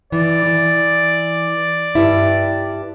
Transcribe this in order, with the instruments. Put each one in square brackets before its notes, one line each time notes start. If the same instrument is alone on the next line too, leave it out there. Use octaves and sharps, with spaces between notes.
[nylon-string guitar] E3 [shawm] D5
[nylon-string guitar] E3
G2 G3 E4